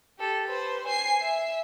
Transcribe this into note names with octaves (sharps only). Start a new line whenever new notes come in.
G4 A4
B4 C5
G#5 C7
E5